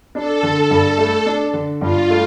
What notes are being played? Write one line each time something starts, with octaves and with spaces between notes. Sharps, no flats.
D4 A4
D3
G2 A4
A3
D4
D3
G2 F4
A3